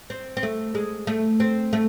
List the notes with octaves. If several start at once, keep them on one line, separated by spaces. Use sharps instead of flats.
C4
C4
A3
G#3
A3
C4
A3